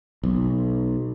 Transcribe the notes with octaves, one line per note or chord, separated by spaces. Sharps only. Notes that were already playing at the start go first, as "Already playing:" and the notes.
B1